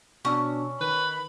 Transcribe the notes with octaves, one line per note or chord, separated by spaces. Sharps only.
B2 C#4 D4 E6
D#3 B4 B5